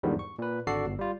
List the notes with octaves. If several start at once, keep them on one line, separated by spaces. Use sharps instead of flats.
E2 G#2 D3 D#3 F3 G3
C#6
A#2 B4
G#1 D3 F#4 A4 D5 C7
G1
G3 F4